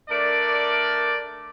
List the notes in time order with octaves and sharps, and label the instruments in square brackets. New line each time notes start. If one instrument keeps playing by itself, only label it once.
[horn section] A3 D4 A#4 D5